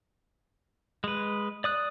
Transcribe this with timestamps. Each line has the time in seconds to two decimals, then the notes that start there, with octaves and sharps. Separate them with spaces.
1.04 G#3 B4
1.64 D5 D#6 F#6